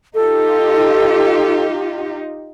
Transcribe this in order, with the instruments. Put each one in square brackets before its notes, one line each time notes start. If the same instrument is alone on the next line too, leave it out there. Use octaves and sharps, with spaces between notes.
[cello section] D#4 F4 G4 [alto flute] A4